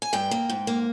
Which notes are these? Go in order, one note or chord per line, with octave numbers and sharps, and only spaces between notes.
G#5
G2 G5
A#3
G#2
A#3